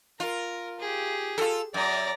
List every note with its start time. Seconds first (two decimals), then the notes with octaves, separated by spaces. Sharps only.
0.20 F4 A#4
0.80 G4 G#4
1.38 F4 A4
1.74 F#2 D5 A#5